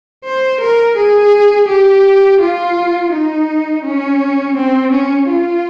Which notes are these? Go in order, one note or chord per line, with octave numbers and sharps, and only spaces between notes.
C5
A#4
G#4
G4
F4
D#4
C#4
C4
C#4
F4